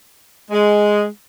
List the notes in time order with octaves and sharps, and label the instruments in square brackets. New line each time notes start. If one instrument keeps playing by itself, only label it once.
[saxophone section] G#3